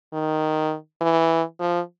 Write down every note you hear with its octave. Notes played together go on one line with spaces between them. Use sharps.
D#3
E3
F3